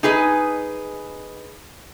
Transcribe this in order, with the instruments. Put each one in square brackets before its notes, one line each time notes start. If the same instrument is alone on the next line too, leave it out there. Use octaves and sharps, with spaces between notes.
[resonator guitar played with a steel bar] D#4 G#4 B4 D#5